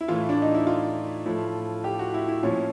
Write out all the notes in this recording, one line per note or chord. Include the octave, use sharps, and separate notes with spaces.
E4
A2 E3 F4
D4
D#4
E4
F4
A2 F3
G4
F#4
E4
E4
A#2 F3 C#4